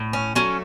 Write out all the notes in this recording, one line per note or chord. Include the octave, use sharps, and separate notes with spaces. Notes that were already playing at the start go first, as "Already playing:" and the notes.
Already playing: A2
C#4
F#3 A3 C#4